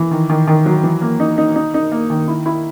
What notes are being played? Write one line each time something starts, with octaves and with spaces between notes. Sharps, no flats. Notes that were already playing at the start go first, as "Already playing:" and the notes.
Already playing: E3
D#3
D#3
D#3
F#3
E3
A#3
D#4
D#4
D#4
D#4
A#3
D#3
E4
E4